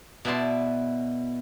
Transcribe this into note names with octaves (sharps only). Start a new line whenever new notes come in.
B2 B3 E4 D5 A5 C6